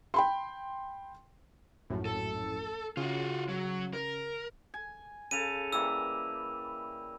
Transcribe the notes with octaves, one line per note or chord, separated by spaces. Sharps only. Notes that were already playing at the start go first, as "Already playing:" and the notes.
G5 B5 C6
A#1 F#2 A2
A4
C#3 F4 F#4
F#3
A#4
G#5
C#3 A4 F5 D#7 F7
E3 G3 A#3 E6